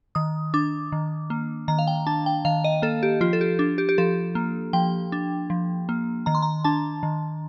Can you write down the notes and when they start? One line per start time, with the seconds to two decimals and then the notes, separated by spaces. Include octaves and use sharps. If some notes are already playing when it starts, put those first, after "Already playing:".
0.15 D#3 D#6
0.54 D4 D6
0.92 D#3
1.30 A#3
1.68 D#3 A#5
1.79 F5
1.87 G5
2.07 D4 A5
2.26 G5
2.45 D#3 F5
2.64 D#5
2.82 A#3 A4
3.03 G4
3.21 F3 F4
3.33 A4
3.41 G4
3.59 D4
3.78 G4
3.89 G4
3.98 F3 A4
4.35 A#3
4.73 F3 G5
5.12 D4
5.50 F3
5.89 A#3
6.26 D#3 A#5
6.35 C6
6.42 A#5
6.64 D4 A5
7.03 D#3